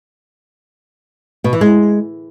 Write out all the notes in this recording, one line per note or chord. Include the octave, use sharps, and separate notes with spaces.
B2
E3
G#3